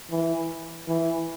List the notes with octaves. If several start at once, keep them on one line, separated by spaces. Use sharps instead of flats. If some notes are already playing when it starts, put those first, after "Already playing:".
E3
E3